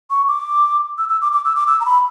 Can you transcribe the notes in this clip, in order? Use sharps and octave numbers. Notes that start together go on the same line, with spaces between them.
C#6
D6
E6
E6
D6
D6
E6
D6
E6
A#5
B5